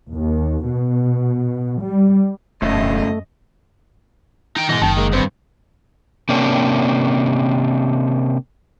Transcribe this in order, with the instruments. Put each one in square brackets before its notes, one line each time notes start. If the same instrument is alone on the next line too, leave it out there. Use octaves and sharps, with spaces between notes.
[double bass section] D#2
B2
G3
[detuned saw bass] E1 [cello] F#2 D#5 [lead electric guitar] A2 C#3 [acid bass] A3
[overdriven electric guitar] D#4 G5
[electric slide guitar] B2 E3 [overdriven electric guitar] G#3 D#4
[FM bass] F#1 [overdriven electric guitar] D#3 [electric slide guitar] A5
[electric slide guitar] G#3 A#3
[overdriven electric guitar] G2 [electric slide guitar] D#3 C4 C5
[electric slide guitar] C3 A#3 C#4 D4